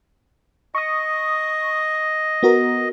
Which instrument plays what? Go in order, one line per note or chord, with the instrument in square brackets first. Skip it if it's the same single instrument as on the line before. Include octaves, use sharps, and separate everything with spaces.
[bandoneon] D#5 [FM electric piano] C#6 D#6
[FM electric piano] B3 F#4 A#4